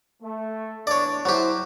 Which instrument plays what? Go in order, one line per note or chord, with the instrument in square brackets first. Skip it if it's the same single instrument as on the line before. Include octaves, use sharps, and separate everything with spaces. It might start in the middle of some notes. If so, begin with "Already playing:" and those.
[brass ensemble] A3
[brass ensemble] E2 D4 [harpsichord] C#5 D5
[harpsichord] F#3 G4 [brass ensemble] E4 C5